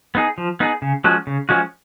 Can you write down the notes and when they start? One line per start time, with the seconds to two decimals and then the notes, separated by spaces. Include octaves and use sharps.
0.15 B3 D#4 G#4
0.38 F3
0.60 B3 D#4 G#4
0.82 C#3
1.04 F3 G#3 C#4 F#4
1.27 C#3
1.49 F3 G#3 C#4 F#4